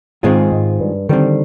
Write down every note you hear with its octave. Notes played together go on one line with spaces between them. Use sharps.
G#2 D#3 G#3 C4 F4 G#4
G#2
G2
D3 D#3 G3 C4